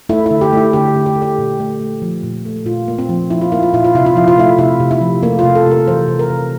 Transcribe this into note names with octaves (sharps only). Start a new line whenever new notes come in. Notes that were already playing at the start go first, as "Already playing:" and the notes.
A3 E4
D3 E4
G4
A3 E4
D3 G4
D3
G4
A3
G4
A#2
A3
A3
F3
A#2
A3
A#2 F4
A#3
C4
F3
F3 E4
F4
A#3 E4
F4
A#2 E4
F4
C3 E4
F4
F3 E4
F4
A3 E4
C3 E4
C3
E4
F3
A3 A#3
C3 F4
A4
C3
A#4
E3 C5
C3
A#4
C3